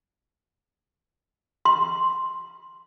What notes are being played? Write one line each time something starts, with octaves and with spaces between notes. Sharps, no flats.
C6